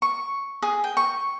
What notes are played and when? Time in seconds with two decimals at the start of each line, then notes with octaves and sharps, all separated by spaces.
0.02 C#6
0.62 G#4
0.84 G5
0.97 C#6